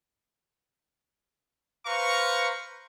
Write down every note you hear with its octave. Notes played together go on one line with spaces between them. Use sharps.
B4 C5 F5 A#5 C#6